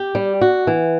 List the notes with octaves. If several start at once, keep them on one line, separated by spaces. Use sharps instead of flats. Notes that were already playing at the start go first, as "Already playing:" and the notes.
Already playing: G4
G3
F#4
E3